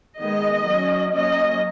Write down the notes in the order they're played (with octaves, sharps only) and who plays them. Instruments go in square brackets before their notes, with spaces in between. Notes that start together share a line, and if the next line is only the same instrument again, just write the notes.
[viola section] D#3 G#3 B3 D#5
F#3 C#4
F#3 A#3 C#4 D#5